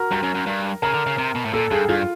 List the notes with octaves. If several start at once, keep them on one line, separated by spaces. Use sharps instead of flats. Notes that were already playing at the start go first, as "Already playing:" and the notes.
Already playing: F#4 A#4
G2 A#4
F#2
F#2
G2
C#3 A#4
D3
C#3
C3
B2
A2
A#2 A4
G2 G#4
G2 F4